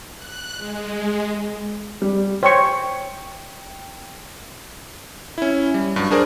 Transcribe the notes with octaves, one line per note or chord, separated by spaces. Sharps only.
F#6
G#3
G3
C5 C#5 G5 C#6
C#4 E4
G3
G2 F#3
D4 G#4 A#4 C5 D5